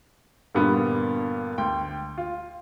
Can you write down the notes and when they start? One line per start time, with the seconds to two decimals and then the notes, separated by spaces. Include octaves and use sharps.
0.55 G2 A#2 D3 G3 B3
1.58 D2 G5
2.18 F4